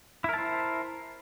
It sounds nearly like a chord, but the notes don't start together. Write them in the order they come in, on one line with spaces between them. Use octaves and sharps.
E4 A#4 A5 C5